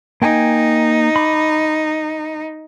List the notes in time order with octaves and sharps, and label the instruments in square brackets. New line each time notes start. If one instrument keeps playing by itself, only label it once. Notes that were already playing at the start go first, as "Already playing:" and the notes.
[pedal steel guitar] A#3 G5 G#5 [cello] D#4
[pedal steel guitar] B5 D6